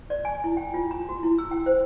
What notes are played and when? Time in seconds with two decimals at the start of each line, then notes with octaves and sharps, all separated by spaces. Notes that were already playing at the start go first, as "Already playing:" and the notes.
0.10 D5
0.25 G#5
0.44 E4
0.57 G5
0.74 F4
0.91 A#5
1.09 F#4
1.23 E4
1.39 E6
1.51 G5
1.66 C5